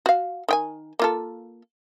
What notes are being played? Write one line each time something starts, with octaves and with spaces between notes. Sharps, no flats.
F#4 F5
D#3 G5 G#5
A#3 F4 A4